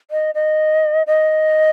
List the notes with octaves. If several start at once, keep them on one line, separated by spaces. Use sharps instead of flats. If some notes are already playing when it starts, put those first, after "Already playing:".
D#5
D#5
D#5